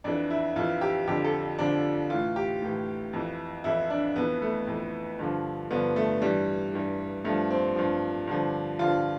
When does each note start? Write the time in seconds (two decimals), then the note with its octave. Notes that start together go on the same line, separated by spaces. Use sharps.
0.04 F2 E3 D4
0.30 E4
0.56 F2 E3 F4
0.81 G4
1.07 F2 D3 F3 G4
1.24 A4
1.59 F2 D3 F3 D4
2.10 A2 E3 F4
2.36 G4
2.62 A2 E3
3.13 F2 E3
3.64 F2 E3 E4
3.90 D4
4.16 F2 E3 B3
4.42 A3
4.67 F2 E3
5.19 G2 D3 F3
5.70 G2 D3 F3 B3
5.96 A3
6.22 G2 E3 G3
6.74 G2 E3
7.24 G2 F3 A3
7.50 C4
7.76 G2 F3
8.27 G2 D3 F3
8.79 G2 D3 F3 F4